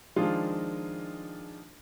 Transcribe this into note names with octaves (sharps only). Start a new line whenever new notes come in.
D#3 F3 G#3 D4 D#4 F4